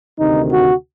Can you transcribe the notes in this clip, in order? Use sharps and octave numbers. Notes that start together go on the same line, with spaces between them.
D2 C3 D#3 D#4
F#4